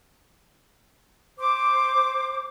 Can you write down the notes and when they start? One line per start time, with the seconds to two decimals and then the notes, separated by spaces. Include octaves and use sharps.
1.38 C5 D6